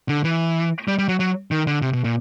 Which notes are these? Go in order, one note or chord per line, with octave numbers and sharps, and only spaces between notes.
D3
E3
G3
G3
F#3
F#3
D#3
D3
C3
B2
A#2